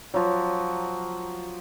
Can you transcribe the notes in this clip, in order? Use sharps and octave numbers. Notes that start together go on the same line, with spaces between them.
F3 F#3